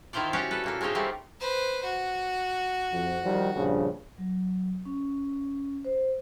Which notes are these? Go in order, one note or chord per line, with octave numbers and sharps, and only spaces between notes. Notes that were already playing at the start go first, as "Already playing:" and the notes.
D#3 E4 F4 C5 D5
C#4 F#4 G4 C#5 D5
A4 B4
A#2 A#3 A4
G#3 C4 C#4 D#4 F4 E5
G3 A3 A#3 C4
B4 C5
F#4
F2
D#3 F3 G3
A#1 G2 C#3
F#3
C#4
C5